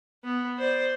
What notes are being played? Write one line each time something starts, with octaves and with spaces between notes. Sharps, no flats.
B3
C5 D5